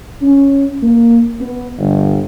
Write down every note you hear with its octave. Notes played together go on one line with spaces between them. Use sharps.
C#4
A#3
B3
G1